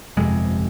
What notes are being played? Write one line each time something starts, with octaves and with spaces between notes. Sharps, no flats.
G1 F2 C3 G#3